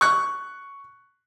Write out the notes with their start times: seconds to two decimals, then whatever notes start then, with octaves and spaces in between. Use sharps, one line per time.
0.01 C#6 F#6